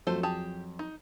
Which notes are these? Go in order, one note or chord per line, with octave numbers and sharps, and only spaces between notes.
F2 F#3 A3 A4 C5
G4 G#4 A5
D#4